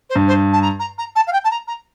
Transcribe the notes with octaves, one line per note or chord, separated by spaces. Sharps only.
C5
G2
C5
A5
A#5
A#5
A#5
A5
F5
G5
A5
A#5
A#5